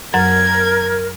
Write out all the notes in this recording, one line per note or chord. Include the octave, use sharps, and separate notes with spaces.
F#2 F#3 A#4 F#5 G#6